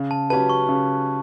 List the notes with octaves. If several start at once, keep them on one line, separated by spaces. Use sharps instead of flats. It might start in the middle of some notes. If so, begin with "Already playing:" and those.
Already playing: C#3
A5
F#3 C#4 G4 B4 A5
C#6
C#3